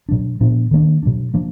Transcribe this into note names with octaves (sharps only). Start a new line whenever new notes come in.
B2 F#3 D4
A#2 F3 B3 D4
D#3 A#3 D4
B2 F#3 D4
F3 A#3 D4